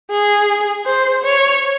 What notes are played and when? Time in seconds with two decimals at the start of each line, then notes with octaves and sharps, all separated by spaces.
0.11 G#4
0.86 C5
1.24 C#5